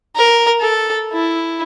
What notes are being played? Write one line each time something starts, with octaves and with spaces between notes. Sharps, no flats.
A#4
A4
E4